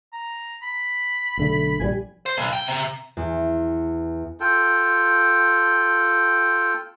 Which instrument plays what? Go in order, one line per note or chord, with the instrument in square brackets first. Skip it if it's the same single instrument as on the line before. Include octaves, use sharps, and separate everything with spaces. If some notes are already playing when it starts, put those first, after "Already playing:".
[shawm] A#5
B5
[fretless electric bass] B1 D3 A3
[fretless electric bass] A#1 E3 G3 [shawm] G#5
[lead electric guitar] C5
B1
G5
C3
[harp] E2
[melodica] F4 A4 G5